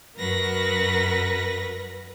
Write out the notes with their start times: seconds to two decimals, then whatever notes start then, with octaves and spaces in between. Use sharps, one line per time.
0.17 F#2 F#3 A#4 B4 A#6